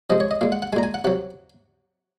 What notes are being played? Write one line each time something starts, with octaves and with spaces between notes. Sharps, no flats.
C3 F3 G#3 D#5
C#5
D#5
A#2 G#3 F5
F#5
F#5
A#2 G#3 G#5 A#5
G#5
F#5
C3 F#3 F#5